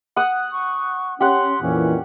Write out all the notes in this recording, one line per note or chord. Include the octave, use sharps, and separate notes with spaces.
F#5 D#6
C#6
C#4 G4 F#5 C6
F2 A#2 E3 C#4